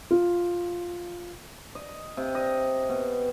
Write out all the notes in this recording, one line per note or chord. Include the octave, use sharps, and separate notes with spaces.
F4
D#5
C3
D#5
B2